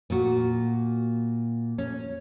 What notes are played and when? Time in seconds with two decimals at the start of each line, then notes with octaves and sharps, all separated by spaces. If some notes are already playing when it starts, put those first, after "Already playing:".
0.10 A#2 F#4
1.78 C#4